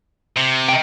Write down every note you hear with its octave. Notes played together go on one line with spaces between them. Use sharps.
C3
D#5 G5